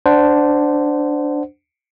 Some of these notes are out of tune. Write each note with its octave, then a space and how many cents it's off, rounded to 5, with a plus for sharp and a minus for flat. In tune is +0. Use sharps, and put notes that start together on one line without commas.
D4 +0 C5 -15 F#5 +0